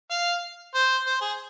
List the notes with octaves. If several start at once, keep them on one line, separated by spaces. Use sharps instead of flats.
F5
C5
C5
G#4